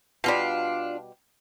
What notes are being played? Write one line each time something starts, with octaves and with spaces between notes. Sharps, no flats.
B2 G3 D4 F4 F5